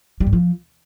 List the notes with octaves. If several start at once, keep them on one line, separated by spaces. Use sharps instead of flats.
G3
G#2
F3